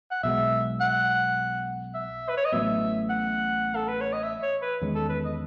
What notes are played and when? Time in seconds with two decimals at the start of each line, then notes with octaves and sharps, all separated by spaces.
0.11 F#5
0.23 B1 B2 G#3 E5
0.81 F#5
1.94 E5
2.29 B4
2.37 C#5
2.45 D#5
2.52 A1 A2 F#3 B3 E5
3.10 F#5
3.76 A4
3.88 B4
4.01 C#5
4.13 D#5
4.24 E5
4.43 C#5
4.62 B4
4.81 E2 D#3 G#3 C#4
4.95 A4
5.09 B4
5.25 D#5